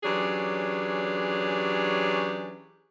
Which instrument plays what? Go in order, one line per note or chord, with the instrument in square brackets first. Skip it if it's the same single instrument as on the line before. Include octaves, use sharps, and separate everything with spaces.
[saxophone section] E3 F#3 C#4 D4 G4 G#4